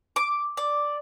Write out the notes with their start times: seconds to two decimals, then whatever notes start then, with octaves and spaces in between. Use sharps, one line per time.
0.16 D6
0.57 D5